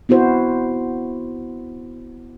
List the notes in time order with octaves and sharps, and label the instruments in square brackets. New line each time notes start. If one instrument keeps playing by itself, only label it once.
[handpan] B3 E4 F#4 C5